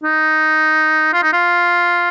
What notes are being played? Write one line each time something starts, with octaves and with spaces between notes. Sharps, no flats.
D#4
F4
D#4
F4